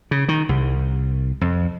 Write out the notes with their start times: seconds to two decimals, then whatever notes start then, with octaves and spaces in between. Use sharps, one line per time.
0.11 C#3
0.29 D#3
0.49 C2
1.41 F2